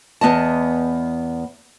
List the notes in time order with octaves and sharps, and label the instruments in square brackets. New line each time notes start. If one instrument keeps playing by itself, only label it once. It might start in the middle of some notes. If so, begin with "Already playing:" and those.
[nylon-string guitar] E2 B3 D#5 A5